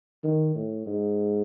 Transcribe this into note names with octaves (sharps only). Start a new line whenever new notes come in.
D#3
A2
G#2